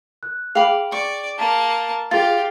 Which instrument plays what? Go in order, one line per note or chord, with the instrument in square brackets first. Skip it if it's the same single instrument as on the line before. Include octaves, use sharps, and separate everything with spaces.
[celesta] F#6
[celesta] G#4 G5 [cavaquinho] F5 B5 D6
[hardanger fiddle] D5 [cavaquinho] C#6
[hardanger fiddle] A#3 A5
[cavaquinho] F4 [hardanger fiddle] G4 F5 [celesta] G#4 A6